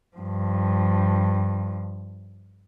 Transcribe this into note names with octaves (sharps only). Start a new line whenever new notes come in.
G2 F3